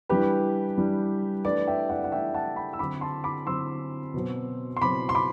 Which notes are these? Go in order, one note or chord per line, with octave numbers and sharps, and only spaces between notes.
E3 G3 D4 G4 B4
E3 G3 D4
E3 A3 D4 B4 D5
E5 G5
D5 F#5
F#5
E3 A3 D4 E5 G5
F#5 A5
G5 B5
E6
D3 F#3 C4 B5 D6
A5 C6
B5 D6
D3 F#3 C4 C6 E6
B2 F#3 C4
C6
B2 F#3 C4 B5 D6
C6
B5 D6